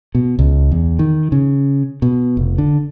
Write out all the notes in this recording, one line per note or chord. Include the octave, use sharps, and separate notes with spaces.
B2
C#2
E2
D#3
C#3
B2
F1
D3